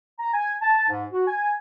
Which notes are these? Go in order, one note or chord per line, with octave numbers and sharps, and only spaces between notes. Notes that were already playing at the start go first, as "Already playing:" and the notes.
A#5
G#5
A5
G#2
F#4
G#5